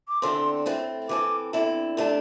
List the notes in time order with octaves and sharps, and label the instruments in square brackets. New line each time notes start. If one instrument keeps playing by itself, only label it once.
[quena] D6
[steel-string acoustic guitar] E2 D3 C4 A4 [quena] C6
[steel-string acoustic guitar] A2 A3 C4
[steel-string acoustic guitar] E3 C4 A4 [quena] D6
[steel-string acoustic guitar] E2 D3 C4 E4 A4
C3 A3 D4 A4